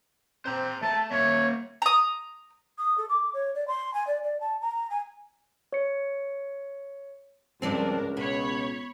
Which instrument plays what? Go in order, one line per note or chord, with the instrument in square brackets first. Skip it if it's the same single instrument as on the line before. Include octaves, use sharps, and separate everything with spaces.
[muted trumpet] C4 [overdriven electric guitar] C5 A#5
[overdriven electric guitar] A3 [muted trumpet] A5
[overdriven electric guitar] A#3 E5 [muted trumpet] C#5
[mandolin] A#5 D#6
[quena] D#6
A4
D6
C#5
D5
C6
G#5
D5
D5
A5
A#5
G#5
[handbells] C#5 C#7
[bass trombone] C#2 [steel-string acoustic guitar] G2 F3 C4 [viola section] D4 A#4
[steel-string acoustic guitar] B2 [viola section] C#5 B5